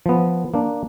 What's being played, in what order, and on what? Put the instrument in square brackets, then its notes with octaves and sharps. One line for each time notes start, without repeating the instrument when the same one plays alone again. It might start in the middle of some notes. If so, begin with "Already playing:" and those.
[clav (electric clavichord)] F3 B3
A#3 D4